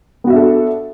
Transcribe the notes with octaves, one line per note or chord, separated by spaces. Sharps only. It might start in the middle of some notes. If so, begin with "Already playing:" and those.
B3 D4 F#4 A4 E5